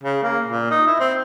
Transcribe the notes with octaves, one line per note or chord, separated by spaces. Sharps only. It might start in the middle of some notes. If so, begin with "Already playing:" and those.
C#3
A#3
A#2
D#4
E4
C4